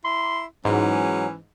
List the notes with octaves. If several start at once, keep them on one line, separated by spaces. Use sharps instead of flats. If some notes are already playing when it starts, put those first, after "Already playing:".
E4 C6
G#2 E3 F#3 C#4